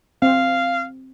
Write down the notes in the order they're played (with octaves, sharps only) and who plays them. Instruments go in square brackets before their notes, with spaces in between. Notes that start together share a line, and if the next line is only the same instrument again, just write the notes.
[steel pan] C4 [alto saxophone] F5